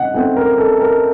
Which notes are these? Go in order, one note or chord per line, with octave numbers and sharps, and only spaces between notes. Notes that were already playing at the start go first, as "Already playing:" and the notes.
Already playing: C#3 A3 C4 D#5 F#5
C#3 A3 C4 F#5
A#4
A4
A#4